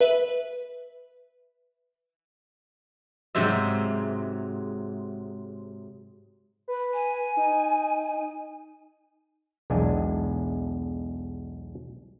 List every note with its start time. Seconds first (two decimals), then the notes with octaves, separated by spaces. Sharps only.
0.01 B4 E5
3.35 G#2 C3 F#3 C5 E5
6.68 B4
6.94 G#5
7.37 D#4
9.70 B1 E2 G#3 D4 G#5